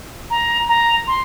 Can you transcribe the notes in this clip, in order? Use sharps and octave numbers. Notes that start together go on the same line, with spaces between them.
A#5
A#5
C6